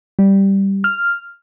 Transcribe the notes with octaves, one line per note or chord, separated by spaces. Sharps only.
G3
F6